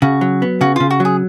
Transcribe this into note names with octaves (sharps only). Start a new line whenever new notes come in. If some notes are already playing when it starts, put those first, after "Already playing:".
C#3 F#4
F#3
B3
C#3 F#4
C#3 F4
F#4
F#3 G#4